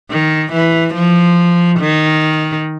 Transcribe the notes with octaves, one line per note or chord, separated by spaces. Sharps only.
D#3
E3
F3
D#3